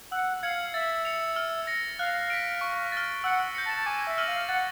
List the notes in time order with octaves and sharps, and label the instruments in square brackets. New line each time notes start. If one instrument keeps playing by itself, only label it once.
[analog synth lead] F#5 [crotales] E6
[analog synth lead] F5 [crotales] G#6 C#7 F#7
[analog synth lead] E5 [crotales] A6
[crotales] C#7 F7
F6
A#6 C#7
[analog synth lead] F5 [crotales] F#6
[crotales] B6 D7
C#6
F6 A6
[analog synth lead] F#5 [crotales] E6
[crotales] G6 A#6 C#7
[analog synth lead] A5
A5
[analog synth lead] G#5 [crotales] D6
[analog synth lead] E5
[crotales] F6 A#6 D#7 F#7
[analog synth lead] F5
[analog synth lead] F#5 [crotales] A6